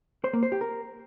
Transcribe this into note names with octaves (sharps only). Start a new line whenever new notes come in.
C5
A#3
C5
G4
A#4